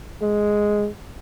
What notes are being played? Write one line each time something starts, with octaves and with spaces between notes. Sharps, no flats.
G#3